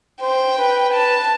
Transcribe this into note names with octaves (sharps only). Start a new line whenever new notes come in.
C5 G5
B4
A5